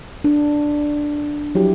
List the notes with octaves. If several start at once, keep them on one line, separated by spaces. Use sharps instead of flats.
D4
F3 F#3 E4 G4